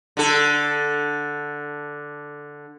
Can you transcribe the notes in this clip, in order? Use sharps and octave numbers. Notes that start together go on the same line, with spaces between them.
D3 A4